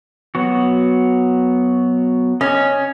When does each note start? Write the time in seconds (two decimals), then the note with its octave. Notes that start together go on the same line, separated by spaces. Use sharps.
0.35 F#3 B3 F#4
2.41 C#4 D#5